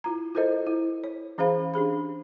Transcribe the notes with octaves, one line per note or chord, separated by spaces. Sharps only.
E4 F4 A#5
E4 F4 A4 A#4 C5 D#5
E4
C#5
E3 C#4 G#4 C5 F5 B5
D4 G4 G#4 B5